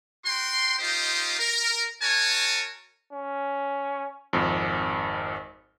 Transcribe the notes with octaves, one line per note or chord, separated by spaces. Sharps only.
F#4 G5 C6
D#4 F4 G4 C5 D#5
A#4
F#4 A#4 C#5 G#5 A5
C#4
G#1 F2